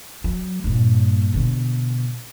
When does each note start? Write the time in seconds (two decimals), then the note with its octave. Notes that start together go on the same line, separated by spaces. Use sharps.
0.24 F#3
0.64 G2 A#2
1.34 B2 D3